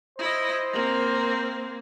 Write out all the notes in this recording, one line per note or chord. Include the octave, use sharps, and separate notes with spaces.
E4 C5 D#5
A#3 C4